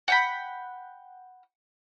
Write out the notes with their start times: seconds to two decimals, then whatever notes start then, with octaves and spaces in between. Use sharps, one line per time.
0.08 F#5 G5 B5